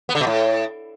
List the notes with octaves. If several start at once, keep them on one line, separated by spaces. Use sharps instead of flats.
B3
D3
B2
A2